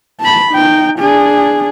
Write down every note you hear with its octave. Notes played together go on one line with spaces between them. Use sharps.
A5 B5
D#4 G5
D4 G#4